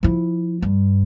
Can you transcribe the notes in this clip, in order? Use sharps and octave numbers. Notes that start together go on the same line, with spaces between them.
F3 E4
G2